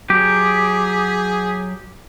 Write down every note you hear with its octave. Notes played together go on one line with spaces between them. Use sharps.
F#3 G4 G#4